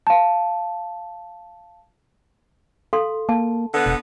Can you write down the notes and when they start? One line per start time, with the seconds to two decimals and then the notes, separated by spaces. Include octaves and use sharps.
0.07 F5 A5
2.93 A4 F5 C6
3.29 A#3 A5
3.74 D3 B3
3.86 E1